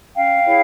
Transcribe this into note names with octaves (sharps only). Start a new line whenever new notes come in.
C#4 F5 G5
E4 G#4 C#5